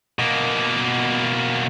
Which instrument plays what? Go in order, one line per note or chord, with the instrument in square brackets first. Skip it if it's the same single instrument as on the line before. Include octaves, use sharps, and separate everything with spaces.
[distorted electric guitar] B2 A#3